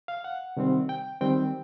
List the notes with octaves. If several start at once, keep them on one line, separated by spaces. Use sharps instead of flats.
F5
F#5
C3 D#3 G3 C4
G5
D#3 G3 C4 G5